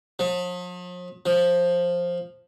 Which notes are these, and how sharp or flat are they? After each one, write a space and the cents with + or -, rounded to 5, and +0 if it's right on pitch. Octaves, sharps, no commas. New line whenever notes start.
F3 +45
F3 +10